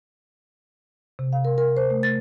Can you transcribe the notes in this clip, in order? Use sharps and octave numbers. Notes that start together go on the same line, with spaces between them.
C3
F5
A#4
A#4
C5
A3
A6